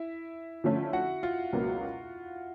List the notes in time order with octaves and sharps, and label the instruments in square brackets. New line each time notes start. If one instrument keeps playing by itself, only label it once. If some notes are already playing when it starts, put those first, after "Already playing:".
Already playing: [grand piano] E4 E5
[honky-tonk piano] D3 F3 A3 C#4
[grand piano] F#4 F#5
F4 F5
[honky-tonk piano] C#2 B2 F#3 A#3